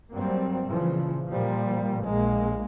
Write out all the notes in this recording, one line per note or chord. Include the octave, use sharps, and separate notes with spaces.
G2 F#3 G3 A#3 C4
A#2 C#3 E3 F3
A#2 F3 G3 A#3
A#1 G#3 A#3